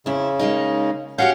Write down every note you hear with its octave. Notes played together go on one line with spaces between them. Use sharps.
F2 C#3 E4
G#3 A#3 D#4
C#4 F#4 G4 F5 F#5 G6